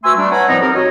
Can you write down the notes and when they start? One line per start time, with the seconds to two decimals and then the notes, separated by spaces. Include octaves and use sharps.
0.04 A3 F#4 B4 G#5 C6 E6
0.16 G3 A3 D4
0.32 B4 C#5 F#5 G#5 A#5 B5
0.48 A2 F3 G3 B3 C4 D#4
0.61 C4 D#4 G4 A#4
0.74 F#4 C#5 D#5